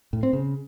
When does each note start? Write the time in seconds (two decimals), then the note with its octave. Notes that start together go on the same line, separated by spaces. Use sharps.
0.13 A2
0.23 C4
0.33 C#3